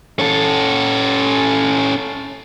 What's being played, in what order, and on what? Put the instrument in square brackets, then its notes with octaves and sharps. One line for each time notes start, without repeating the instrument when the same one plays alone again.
[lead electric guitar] C#4 A4